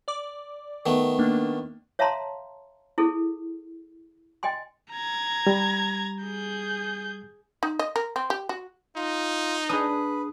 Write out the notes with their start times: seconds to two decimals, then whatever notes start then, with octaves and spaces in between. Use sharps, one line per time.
0.08 D5 D6
0.86 D#3 A3 B3
1.19 A#3 D4
1.99 C#5 E5 F5 A5 A#5 C6
2.98 E4 G#4 A4
4.43 D#5 G5 G#5 C6
4.93 A#5 G#6
5.47 G3
6.23 G#4 G6
7.63 D#4
7.79 D#5
7.96 A#4
8.16 C4
8.30 G4
8.49 F#4
8.96 D#4 F4 C6
9.69 D4 G#4 B4 D#6